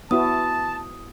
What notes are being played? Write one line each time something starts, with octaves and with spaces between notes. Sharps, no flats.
B3 E4 F#4 A5 D#6